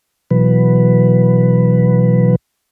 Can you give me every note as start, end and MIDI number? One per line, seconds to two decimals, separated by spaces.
0.31 2.36 47
0.31 2.36 52
0.31 2.36 54
0.31 2.36 71